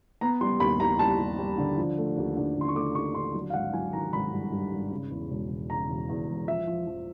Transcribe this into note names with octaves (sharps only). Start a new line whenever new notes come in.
B3 A#5
G3 C6
D#2 B5
D#2 A#5
G3 A5
G3
G3
D3
F3
A3
D#2
D3
D3
C6
C#6
A3 D6
D#2 C#6
D3 C6
F#3
F5
G#1 F#5
F#3 G#5
D#3 A#5
G#1 B5
G2
G2
G#1
C#3
E2
E1
E1
C#3 A#5
E1
E2
E1
F3 E5
F3
F3